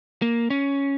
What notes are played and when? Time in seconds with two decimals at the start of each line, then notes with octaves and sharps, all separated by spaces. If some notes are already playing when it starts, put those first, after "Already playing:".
0.22 A#3
0.50 C#4